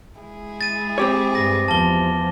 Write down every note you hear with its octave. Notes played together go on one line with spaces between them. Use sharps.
G#3 E4 G#4
A6 D#7
C4 G4 C#5 D6
G2 A#6
E2 F3 A5 G7